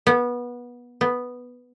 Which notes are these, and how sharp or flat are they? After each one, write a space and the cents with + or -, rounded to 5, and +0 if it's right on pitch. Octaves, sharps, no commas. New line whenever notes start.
B3 -20
B3 +0